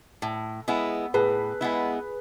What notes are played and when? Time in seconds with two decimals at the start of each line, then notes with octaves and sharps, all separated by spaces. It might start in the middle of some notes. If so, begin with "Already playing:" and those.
0.22 A2
0.68 G#3 B3 E4
1.14 A2 G#4 B4
1.61 G#3 B3 E4